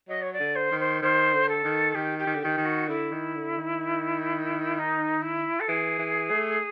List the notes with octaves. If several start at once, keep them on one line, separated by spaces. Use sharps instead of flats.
F#3 D#5
C#5
D5
D3
C5
D#3
C5
D#3 C5
D3
A4
D#3
D#3 G4
G4
D#3
D3
D#3 G4
D#3
F#4
D3 E4
D#3
D3
D#3
E4
D#4
E4
A4
E3 G#4
E3
A3